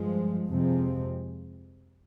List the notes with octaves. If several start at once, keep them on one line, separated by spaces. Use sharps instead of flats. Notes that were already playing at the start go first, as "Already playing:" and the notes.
Already playing: G2 F3 G#3
F2 C3 F3 G#3 C4